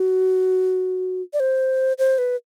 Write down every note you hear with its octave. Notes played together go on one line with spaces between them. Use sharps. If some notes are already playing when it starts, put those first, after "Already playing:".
Already playing: F#4
D5
C5
C5
B4